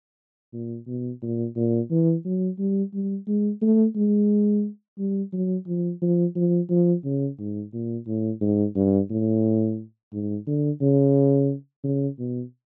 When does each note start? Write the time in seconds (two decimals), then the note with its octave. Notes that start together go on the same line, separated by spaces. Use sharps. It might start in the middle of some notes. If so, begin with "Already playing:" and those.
0.53 A#2
0.87 B2
1.22 A#2
1.56 A#2
1.91 E3
2.25 F#3
2.59 G3
2.94 G3
3.27 G#3
3.62 A3
3.96 G#3
4.98 G3
5.33 F#3
5.67 F3
6.02 F3
6.36 F3
6.70 F3
7.04 C#3
7.39 G#2
7.73 A#2
8.07 A2
8.41 G#2
8.76 G2
9.10 A2
10.13 G#2
10.47 D3
10.81 C#3
11.84 C#3
12.19 B2